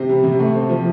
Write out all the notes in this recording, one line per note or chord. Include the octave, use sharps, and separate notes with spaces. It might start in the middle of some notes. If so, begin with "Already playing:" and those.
Already playing: C3 C4 C5
G3
C3
A3
C4
F3